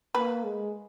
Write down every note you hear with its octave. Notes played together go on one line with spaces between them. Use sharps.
A#3 B4
G#3